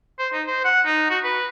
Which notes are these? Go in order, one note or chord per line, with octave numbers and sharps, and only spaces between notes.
C5
D#4
C5
F#5
D#4
F#4
B4